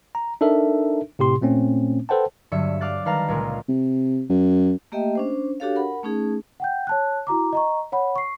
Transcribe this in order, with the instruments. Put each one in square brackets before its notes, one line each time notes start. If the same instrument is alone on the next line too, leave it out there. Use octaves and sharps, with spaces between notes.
[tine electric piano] A#5
D4 D#4 A4 A#4 E5
A2 C3 G4 C6
A#2 A3 C4 C#4
A4 B4 C5 F#5 G5 A5
[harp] G2 D3 F#3 E5 C#7
F5 D6 F#6 A6
D#3 G3 B4 F5 A5 A#5
C#2 A#2 G#3
[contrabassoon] C3
F#2
[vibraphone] A3 A#3 G4 D#5 E5 G5
C#4 D4 C5
D4 F#4 G4 A4 C#5 F5
A#4 F#5 B5
A3 C#4 D#4 G#4
[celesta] F#5 G5 G6
C#5 A5 F#6
E4 F#4 A#5 D6
D#5 A#5 C#6
C#5 F#5 B5
C#6 C7